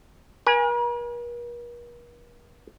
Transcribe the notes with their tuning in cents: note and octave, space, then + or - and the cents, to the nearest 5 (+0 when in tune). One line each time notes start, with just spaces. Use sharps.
A#4 +45 G#5 -10